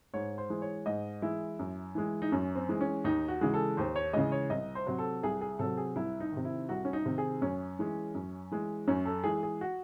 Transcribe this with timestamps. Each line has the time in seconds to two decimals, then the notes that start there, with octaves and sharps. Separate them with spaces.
0.14 G#2 C#5
0.38 C5
0.50 E3 G#3
0.62 C#5
0.86 G#2 D#5
1.22 E3 G#3 E4
1.59 F#2
1.95 E3 G#3
2.22 D#4
2.32 F#2 C#4
2.55 C4
2.69 E3 G#3
2.81 C#4
3.04 D#2 D#4
3.28 F#4
3.41 C#3 E3 G#3
3.54 A4
3.77 D#2 C5
3.96 C#5
4.13 C#3 E3 G#3 D#5
4.32 C#5
4.50 C2 D#5
4.75 C5
4.87 C3 F#3
4.98 A4
5.23 C2 G#4
5.41 G#4
5.59 C3 F#3 A4
5.77 G#4
5.96 C2 E4
6.20 D#4
6.32 C3 D#3
6.45 E4
6.69 C2 F#4
6.85 C#4
6.93 D#4
7.06 C3 D#3
7.18 G#4
7.42 F#2 C#4
7.79 E3 G#3
8.15 F#2
8.51 E3 G#3
8.88 F#2 C#4
9.06 A4
9.24 E3 G#3 G#4
9.43 G#4
9.61 F#4